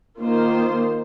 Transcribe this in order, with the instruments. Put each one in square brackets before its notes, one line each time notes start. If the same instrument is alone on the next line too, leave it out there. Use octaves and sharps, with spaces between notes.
[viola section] D#3 A#3 F4 C5